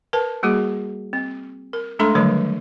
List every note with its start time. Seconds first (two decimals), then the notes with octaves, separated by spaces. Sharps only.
0.13 A#4 B4 A5
0.43 G3 A#3 F#4 G#4
1.13 C4
1.73 A#4
1.99 G#3 A3 D4 A4 B5 C6
2.15 D3 D#3 F#3 G3 A3 B4